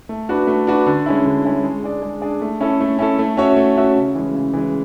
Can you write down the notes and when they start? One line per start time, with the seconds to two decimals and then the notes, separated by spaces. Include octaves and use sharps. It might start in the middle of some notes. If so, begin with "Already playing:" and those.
0.09 A3
0.29 D4 F#4 B4
0.47 A3
0.67 D4 F#4 B4
0.87 D3
1.06 G#3 C#4 E4
1.25 D3
1.45 G#3 C#4 E4
1.64 G#3
1.83 D4 G#4 D5
2.03 G#3
2.22 D4 G#4 D5
2.42 A3
2.60 C#4 E4 A4
2.80 A3
2.98 C#4 E4 A4
3.19 A3
3.37 C#4 F#4 C#5 E5
3.56 A3
3.77 C#4 F#4 C#5 E5
3.95 C#3
4.15 E3 G#3
4.34 C#3
4.53 E3 G#3